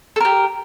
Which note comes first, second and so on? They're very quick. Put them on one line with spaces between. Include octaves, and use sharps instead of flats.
A4 A#4 G4